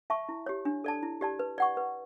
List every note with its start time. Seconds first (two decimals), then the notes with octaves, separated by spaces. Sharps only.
0.10 E5 A5 C#6
0.29 E4
0.46 G4 C#5
0.65 D4
0.84 A4 D5 A5
1.03 E4
1.21 G4 D5 A5
1.39 B4
1.58 D5 F#5 C#6
1.77 B4